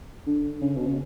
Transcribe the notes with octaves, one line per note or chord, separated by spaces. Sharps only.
D3
C#3
B2
C#3